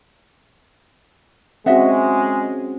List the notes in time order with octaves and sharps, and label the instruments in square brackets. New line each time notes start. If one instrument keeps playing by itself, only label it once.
[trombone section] G#3 [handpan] C4 C#4 F#4 [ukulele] D#5 E5 F#5